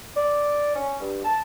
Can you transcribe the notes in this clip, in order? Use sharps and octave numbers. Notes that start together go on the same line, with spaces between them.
D5
C#4
G2
A5